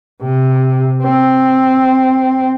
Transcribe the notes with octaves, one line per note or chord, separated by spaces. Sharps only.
C3
C4